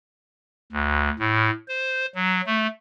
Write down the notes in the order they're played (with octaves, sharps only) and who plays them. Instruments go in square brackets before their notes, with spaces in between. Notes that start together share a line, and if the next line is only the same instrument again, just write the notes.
[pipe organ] D2
A2
C5
F#3
A3